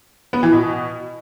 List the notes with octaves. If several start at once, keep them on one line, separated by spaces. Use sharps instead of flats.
B3
E3
B2